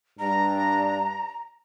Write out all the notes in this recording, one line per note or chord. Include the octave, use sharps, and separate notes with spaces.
G2 G3 D4 A#5